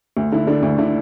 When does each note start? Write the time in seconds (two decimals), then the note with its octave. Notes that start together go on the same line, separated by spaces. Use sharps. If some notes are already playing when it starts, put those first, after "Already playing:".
0.17 D2
0.32 D3 E4
0.47 D3 D4
0.63 D2
0.78 D3 E4